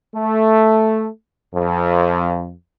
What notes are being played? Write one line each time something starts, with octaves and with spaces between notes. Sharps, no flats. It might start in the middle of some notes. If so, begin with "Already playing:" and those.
A3
F2